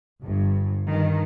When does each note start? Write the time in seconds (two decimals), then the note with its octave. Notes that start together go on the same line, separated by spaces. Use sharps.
0.24 G1 G2
0.88 G2 D#3